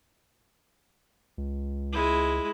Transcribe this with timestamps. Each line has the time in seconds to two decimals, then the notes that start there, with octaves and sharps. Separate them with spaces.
1.38 C#2
1.93 G#3 E4